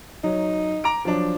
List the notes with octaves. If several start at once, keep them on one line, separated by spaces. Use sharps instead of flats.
F#3 D#4
A#5 D6 D7
F3 F#3 D4